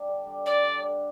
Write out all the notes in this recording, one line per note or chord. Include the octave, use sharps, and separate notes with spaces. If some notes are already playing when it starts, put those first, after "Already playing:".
Already playing: G3 D4 G4
D3
G3 D4 G4
D3 D5
G3 D4 G4
D3